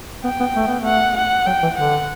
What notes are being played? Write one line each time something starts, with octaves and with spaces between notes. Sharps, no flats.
B3 G5
B3
A3
B3
A3
F#5
F#5
F#3 G5
E3
D3 F#5